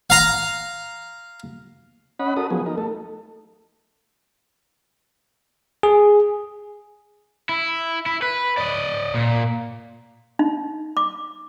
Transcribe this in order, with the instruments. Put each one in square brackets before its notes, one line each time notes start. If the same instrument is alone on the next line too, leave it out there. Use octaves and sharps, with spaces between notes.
[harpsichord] F5 A#5
[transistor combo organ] C#4 D#5 F#5 B5
F#4 A4 A#4 D#6
F3 F#3 B3 G#4
D#4 A#4
A3 A4
[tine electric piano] G#4
[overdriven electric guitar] E4
E4
B4
D5 D#5
A#2
[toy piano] D#4
D6